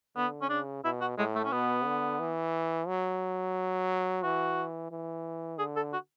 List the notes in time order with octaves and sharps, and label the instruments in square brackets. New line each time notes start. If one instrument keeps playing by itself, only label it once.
[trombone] D3 [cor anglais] B3
[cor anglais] C#4
[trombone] C#3 [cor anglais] D4
[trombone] B2 [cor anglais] E4
[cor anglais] F#4
[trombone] A2 [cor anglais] G#3
[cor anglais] A3
C#4
[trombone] B2 [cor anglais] B3
[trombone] D3
E3
F#3
[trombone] E3 [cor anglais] F#4
[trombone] E3
[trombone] D3 [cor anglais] G#4
[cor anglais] A4
F#4